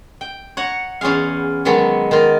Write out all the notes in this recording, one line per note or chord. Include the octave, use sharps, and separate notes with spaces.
G5
C#5 F#5 A#5
E2 C#4 F4 G#4 F5
D#3 F#3 G#3 B3 C#4 A4
D#3 F4